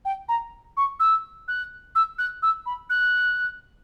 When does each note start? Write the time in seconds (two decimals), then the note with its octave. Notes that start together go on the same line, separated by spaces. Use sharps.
0.05 G5
0.29 A#5
0.77 C#6
1.00 E6
1.48 F#6
1.95 E6
2.18 F#6
2.42 E6
2.66 B5
2.90 F#6